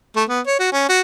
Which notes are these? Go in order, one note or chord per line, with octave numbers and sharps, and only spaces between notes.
A3
B3
C#5
F#4
C#4
F#4